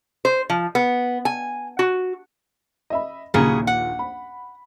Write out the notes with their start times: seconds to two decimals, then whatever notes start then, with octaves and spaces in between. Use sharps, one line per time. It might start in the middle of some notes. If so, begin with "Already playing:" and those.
0.25 C5
0.50 F3
0.75 B3
1.25 G#5
1.79 F#4
2.90 D#5 E5 B5
3.34 A#1 D#2 A#2 C#3 F#3 G#4
3.67 F#5
3.99 B5